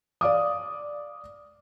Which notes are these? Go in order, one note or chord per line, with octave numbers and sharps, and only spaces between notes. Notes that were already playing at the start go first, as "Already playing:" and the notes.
D5 F5 D6 D#6